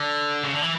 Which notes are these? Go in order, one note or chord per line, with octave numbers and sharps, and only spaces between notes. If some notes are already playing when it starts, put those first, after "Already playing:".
Already playing: D3
C#3
D3
E3